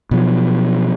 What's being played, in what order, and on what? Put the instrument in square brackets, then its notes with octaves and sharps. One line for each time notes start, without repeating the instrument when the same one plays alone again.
[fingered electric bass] B2 F3 F#3